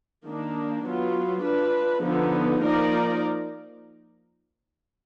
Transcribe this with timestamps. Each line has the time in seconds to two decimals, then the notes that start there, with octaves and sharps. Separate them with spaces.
0.24 D#3 A#3 D4
0.83 F#3 B3 F4
1.41 D4 F4 B4
2.01 D3 F3 B3 D#4
2.60 F3 A#3 D#4 A#4 D5